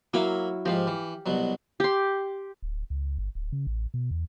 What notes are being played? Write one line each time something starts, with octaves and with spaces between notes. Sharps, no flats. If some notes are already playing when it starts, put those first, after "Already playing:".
F#3 A#3 E4 F5 B5
G#2 F3 G4 F5
E3
C2 B2 F#3
G4 C6
D1
C#2
G1
D1
C#3
A1
B2
E2